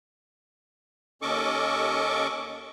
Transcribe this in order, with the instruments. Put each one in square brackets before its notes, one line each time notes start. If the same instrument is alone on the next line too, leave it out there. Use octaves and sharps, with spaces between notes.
[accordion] D#2 C#4 A4 D#5 C#6 D6